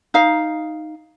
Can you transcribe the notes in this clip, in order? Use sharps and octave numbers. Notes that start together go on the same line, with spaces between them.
D#4 F5